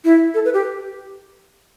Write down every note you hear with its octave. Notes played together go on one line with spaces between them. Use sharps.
E4
A4
B4
G4